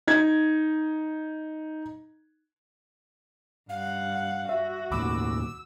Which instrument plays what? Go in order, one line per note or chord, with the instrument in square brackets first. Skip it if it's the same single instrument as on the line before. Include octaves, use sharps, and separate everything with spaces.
[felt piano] D#4 G#6
[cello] G2 F#5 [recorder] F5
[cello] F#4 [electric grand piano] E5
[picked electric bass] D#2 A2 D#3 [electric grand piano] B5 D6 [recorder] E6